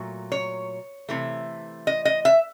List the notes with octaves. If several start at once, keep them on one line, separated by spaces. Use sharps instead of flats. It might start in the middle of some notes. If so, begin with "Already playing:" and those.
Already playing: A#2 F#3 A3
C#5
C3 E3 A3
D#5
D#5
E5